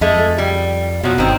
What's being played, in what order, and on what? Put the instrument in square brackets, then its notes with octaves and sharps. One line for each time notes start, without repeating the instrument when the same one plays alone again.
[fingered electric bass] F2 [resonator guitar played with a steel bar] G#3 A3
[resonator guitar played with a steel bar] G3
[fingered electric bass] B2 [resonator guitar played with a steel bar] F3 F#3
[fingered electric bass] G1 [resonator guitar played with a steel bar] D#3 C4